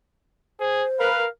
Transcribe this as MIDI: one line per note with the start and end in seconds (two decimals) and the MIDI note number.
0.60 0.84 68
0.60 1.09 72
1.00 1.25 70
1.00 1.25 71
1.00 1.27 77